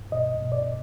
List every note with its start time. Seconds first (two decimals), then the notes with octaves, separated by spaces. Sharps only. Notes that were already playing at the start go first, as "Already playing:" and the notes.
Already playing: G2
0.12 B2 D#5
0.43 B2
0.52 D5